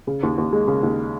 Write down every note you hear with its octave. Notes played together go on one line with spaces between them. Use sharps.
C#3
D#2
D#2
G#3
C#3
D#2